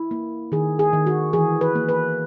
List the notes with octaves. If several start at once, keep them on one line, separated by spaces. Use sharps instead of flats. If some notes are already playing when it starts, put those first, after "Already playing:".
Already playing: E4
A#3
D#3 G#4
G#4
D#3
F#4
E3 G#4
B4
A#3
B4